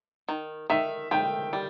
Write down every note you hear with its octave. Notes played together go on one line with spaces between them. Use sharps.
D#3
D#3 E5
D#3 G5
G3